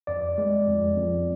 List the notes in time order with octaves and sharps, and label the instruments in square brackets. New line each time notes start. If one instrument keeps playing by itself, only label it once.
[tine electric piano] F2 D5
G#3
F2
F2